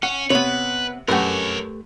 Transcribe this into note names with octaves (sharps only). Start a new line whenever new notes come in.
C#4 F#5
C3 B3 B4 C#5
F#2 A3 G4 A#4 B4 C#5 F#5